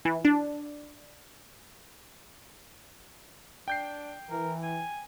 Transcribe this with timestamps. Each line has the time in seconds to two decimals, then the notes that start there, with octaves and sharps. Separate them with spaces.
0.05 E3
0.25 D4
3.68 D4 G5 G6 C7
4.31 E3 A#4
4.63 G#5